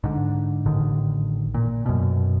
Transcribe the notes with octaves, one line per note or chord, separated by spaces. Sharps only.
G#2 D3
A1 D3 D#3
A#2
F#2 B2